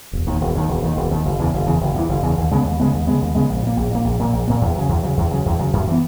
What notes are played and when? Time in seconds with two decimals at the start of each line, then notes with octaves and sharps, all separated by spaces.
0.13 E1
0.27 D#2 D#3
0.41 E1
0.55 D#2 D#3
0.68 E1
0.82 D#2 D#3
0.97 E1
1.11 D#2 D#3
1.25 F#1
1.39 E2 C#3 E3
1.53 F#1
1.66 E2 C#3 E3
1.81 F#1
1.94 E2 C#3 E3
2.09 F#1
2.22 E2 C#3 E3
2.37 D#2
2.51 C#3 G#3 B3
2.65 D#2
2.80 C#3 G#3 B3
2.93 D#2
3.07 C#3 G#3 B3
3.21 D#2
3.35 C#3 G#3 B3
3.49 A#1
3.63 A#2 A#3
3.77 A#1
3.91 A#2 A#3
4.05 A#1
4.19 A#2 A#3
4.33 A#1
4.48 A#2 A#3
4.62 E2
4.76 C#3 F#3
4.89 E2
5.03 C#3 F#3
5.17 E2
5.31 C#3 F#3
5.46 E2
5.59 C#3 F#3
5.73 F#2
5.88 E3 B3